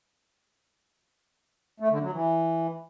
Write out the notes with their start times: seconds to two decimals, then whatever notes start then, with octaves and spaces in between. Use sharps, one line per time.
1.80 A3
1.91 D3
2.01 F#3
2.12 E3